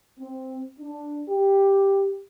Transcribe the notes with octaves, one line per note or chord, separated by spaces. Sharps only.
C4
D4
G4